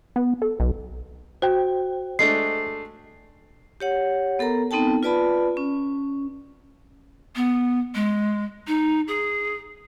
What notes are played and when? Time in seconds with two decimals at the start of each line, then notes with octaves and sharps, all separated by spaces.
0.16 B3
0.42 A4
0.60 B1
1.42 F#4 C5 G5
2.19 G#3 A3 D4 C7
3.80 G4 C#5 F#5
4.39 B3 A4 A#4 A#5
4.71 B3 C4 D#4 A4 G5 A5
5.03 F4 B4 D5 A5 B5
5.57 C#4
7.36 B3
7.95 G#3
8.67 D#4
9.08 G#4